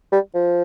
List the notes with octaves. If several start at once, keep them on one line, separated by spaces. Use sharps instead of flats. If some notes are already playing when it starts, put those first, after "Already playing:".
G3
F3